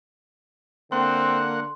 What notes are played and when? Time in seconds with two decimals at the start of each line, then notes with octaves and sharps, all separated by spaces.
0.92 D3 A#3 C4 F#5 C6